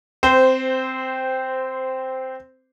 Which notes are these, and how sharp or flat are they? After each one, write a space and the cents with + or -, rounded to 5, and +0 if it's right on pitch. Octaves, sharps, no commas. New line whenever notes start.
C4 -5 C5 -15